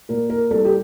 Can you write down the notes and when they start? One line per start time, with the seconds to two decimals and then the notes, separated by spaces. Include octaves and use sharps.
0.09 A#2 A#4
0.30 A#4
0.50 C2 A4
0.65 G4